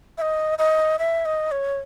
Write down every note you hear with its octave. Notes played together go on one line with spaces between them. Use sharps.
E5
D#5
D#5
E5
D#5
C#5